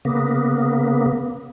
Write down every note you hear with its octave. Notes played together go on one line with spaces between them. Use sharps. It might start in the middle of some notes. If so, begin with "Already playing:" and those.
C#3 A#3 B3